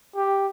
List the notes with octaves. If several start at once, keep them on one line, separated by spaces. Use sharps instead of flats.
G4